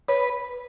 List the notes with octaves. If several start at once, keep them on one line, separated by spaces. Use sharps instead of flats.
B4 C#5